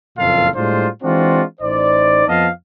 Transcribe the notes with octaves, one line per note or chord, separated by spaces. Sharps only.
F#1 F2 A#2 F4 A4 F5
A2 G3 G#3 D4 F4 C5
E3 G#3 C4 D4 F4 F#4
A1 D#4 C5 D5
F2 F3 B3 D#5 F5 A5